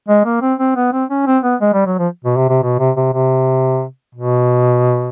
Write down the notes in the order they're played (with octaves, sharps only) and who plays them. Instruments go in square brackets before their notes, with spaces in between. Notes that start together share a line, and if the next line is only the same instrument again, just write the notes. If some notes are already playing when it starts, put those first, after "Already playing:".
[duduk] G#3
A#3
C4
C4
B3
C4
C#4
C4
B3
G#3
G3
F#3
F3
B2
C3
C3
B2
C3
C3
C3
B2